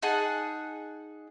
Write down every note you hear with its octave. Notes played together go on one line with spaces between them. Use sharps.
D#4 G#4 F#5 A5